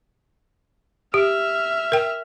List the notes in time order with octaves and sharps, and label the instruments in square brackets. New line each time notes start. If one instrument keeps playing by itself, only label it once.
[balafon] G4 [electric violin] E5 F6
[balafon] A#4 G5